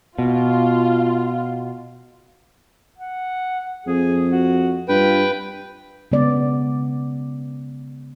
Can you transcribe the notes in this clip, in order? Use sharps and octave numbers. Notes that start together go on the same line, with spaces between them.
B2 F4
F#5
F2 G#4
F#4
G2 F4 B4 G5
C#3 G#3 B3 D5